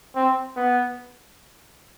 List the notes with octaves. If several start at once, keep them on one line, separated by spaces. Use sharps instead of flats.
C4
B3